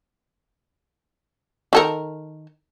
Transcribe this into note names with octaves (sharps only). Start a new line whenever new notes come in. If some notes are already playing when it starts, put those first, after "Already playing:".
D#3 A4 A#4